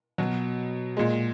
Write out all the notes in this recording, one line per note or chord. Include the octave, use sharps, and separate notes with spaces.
B2 F#3
A#2 G#3